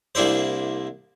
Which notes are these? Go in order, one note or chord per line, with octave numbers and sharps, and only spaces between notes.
C2 A#3 D4 E4 C5